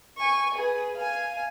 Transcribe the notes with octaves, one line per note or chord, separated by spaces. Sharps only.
G#5 C#6
G#4 B4
F5 G#5